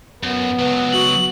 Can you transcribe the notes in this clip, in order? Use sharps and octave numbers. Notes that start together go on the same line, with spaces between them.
F#2 B3
C#2 F#3 B4
F#4 F#7